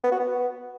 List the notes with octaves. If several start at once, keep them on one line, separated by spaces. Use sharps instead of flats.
B3
F#4
B3